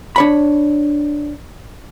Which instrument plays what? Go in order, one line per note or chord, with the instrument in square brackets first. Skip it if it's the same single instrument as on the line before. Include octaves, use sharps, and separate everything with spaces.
[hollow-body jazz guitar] D4 C#5 B5